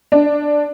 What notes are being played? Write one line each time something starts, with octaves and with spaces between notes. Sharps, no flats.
D4